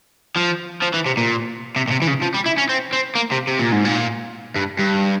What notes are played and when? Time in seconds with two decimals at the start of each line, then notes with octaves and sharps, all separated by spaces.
0.36 F3
0.82 F3
0.94 E3
1.06 C3
1.17 A#2
1.76 C3
1.88 A#2
1.91 C3
2.02 E3
2.07 C#3
2.22 F3
2.34 G3
2.46 E4
2.58 C#4
2.69 C4
2.93 C4
3.15 A#3
3.31 C3
3.47 C3
3.59 A#2
3.72 G#2
3.85 A#2
4.56 G2
4.79 G2